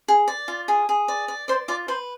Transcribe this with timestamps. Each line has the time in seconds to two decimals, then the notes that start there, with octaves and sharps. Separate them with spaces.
0.08 G#4
0.28 D5
0.48 F4
0.68 G#4
0.89 G#4
1.08 D5
1.28 D5
1.48 C5 D5 C6
1.68 F4 D5 D6
1.88 B4 C5 C6